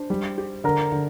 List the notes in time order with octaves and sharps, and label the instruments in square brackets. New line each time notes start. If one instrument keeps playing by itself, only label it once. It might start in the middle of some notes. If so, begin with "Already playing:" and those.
Already playing: [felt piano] D4 [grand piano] C5
[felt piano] G3
G4
[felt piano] D3 [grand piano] A#4
[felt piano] D3